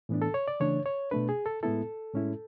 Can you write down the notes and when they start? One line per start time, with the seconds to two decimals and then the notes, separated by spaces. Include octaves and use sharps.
0.09 A2 E3 B3 D4
0.22 A4
0.34 C#5
0.48 D5
0.60 C#3 E3 A3 D4 C#5
0.86 C#5
1.11 B2 A3 D4 B4
1.29 G#4
1.46 A4
1.63 A2 G#3 B3 E4 A4
2.14 A2 G#3 C#4 E4